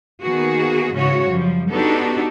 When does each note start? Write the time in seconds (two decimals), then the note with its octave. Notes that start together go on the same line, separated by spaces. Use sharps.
0.22 D#3 A#3 B3 F#4 G#4
0.93 G#2 C#3 E3 C#4 F#4 C#5
1.28 F#2 F3 G3
1.69 B3 D4 D#4 F#4 G4 A4